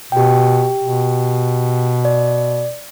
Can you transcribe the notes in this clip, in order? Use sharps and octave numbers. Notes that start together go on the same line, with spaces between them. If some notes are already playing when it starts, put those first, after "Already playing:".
B2 G4 G5
B2
D5